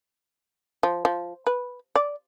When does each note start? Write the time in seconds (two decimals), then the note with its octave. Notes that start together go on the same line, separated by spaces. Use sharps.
0.83 F3
1.05 F3
1.47 B4
1.96 D5